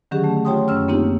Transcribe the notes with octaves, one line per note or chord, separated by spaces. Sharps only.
D3 D#3 F#3 C#4 G4 G#4
A3
F4 G4 C#5 G5 C6 D#6
F#2 C#4 E6 F6
A#3 C4 D4 D#4 F4 G4